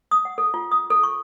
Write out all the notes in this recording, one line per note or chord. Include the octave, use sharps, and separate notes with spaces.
D#6
F#5
A4
F4
D#6
A4
C#6